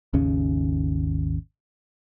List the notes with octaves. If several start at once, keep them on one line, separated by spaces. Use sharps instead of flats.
G#1 D#2 C#3 C#4